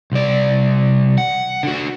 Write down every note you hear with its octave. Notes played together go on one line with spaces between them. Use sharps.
C2 D5
F#5
D3 F#4